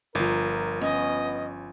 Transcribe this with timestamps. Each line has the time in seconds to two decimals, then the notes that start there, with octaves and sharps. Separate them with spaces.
0.15 G1 F3 A#4 F5
0.81 B3 C#4 D#5